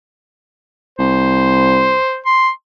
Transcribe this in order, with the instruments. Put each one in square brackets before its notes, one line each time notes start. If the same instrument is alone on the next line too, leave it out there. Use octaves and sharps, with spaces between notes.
[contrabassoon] C2 [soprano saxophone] C5
[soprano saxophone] C6